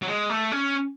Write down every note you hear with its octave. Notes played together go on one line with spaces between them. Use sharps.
F#3
G#3
A3
C#4